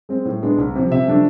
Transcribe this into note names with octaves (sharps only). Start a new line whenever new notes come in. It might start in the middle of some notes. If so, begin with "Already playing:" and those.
G#3 C4
A2
G#3 B3 D4
C2
C3 F3
C3 E5
F3 A3 D4